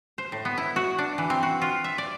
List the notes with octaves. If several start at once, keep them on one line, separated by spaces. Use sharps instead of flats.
C5
A2
B3
E4
F#4
D4
E3
C4
F#4
F4
E5
D5